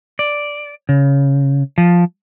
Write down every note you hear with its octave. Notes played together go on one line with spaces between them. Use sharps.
D5
C#3
F3